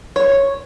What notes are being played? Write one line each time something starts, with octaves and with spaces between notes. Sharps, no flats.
C#5